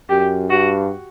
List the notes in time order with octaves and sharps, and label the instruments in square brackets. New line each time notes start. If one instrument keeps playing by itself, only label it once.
[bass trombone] F#2 [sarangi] G4
[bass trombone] G2 [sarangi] F#4